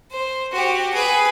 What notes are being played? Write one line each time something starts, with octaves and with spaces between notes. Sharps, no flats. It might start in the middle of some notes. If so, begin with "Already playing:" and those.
C5
F#4 G4
G#4 B4